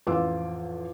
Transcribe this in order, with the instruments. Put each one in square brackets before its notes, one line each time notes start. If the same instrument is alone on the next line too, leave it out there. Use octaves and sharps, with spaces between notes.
[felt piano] A1 F2 F4 D6 E6